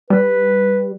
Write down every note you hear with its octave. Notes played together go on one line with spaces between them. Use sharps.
G3 B4